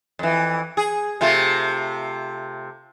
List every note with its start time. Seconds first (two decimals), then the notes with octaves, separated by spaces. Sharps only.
0.19 F2 E3
0.77 G#4
1.21 C3 A3 F4